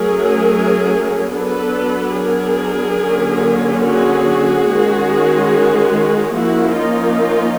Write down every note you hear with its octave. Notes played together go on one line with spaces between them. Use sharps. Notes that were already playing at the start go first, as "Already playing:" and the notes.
Already playing: F#3 A3 C#4 G#4 A#4
F#3 B3 D4 A4 B4
G#4 A#4
D3 F#3 A#3 C#4
F#4 G#4
D#3 G#3 C#4
F3 A#3 C#4 E4 F#4
D#4 F4